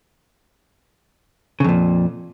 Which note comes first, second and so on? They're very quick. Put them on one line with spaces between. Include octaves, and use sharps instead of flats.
C#3 F2 A#2